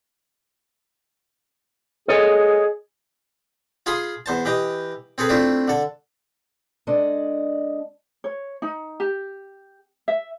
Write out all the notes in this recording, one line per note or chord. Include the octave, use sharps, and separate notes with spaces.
G#4 A4 C#5 D#5
F4 G#4 F5 B5 C6 D#6
E2 C5 A5
E3 G4 D#5
C4 G#4 A4 B4
A3 C4 D4 E4 F4
D3 A4
G#3 D4 A4 D5 D#5
C#5
D#4
G4
E5